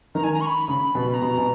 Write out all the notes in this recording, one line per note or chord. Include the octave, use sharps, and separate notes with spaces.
D#3 A#5
G#5
A#5
C#6
B5
C#3 B5
B2
B5
A#5
B2
B2